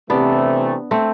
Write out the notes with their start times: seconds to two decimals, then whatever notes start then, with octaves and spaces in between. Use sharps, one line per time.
0.10 C3 E3 A3 B3 D4
0.91 A3 C4